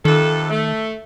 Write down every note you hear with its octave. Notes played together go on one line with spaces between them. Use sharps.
F2 C3 D#3 A4
A3